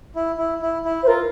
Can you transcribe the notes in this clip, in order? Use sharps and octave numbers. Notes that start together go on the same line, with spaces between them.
E4
E4
E4
E4
C5
F4 A#4